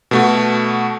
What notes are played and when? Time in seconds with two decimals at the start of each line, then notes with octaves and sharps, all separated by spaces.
0.11 B2 A3 F#4